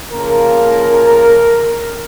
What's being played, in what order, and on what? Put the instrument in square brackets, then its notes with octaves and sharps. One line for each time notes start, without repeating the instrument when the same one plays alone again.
[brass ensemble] C#3 F3 A#3 A#4